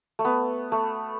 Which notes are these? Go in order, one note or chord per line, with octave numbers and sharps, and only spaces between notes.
A3
B3
A3